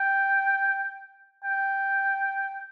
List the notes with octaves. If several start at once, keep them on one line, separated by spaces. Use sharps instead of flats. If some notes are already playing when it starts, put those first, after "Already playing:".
Already playing: G5
G5